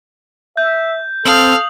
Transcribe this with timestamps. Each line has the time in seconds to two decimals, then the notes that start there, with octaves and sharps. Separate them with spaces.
0.57 E5 G6
1.25 C4 A4 F5 D#6 F6 F#7